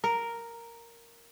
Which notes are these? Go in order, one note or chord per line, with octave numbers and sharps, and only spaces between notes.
A#4